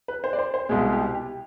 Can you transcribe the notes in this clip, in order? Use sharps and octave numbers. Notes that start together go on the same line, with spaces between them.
B4
C5
D5
C5
C5
C2 B2 G#3 G#4
G4
G4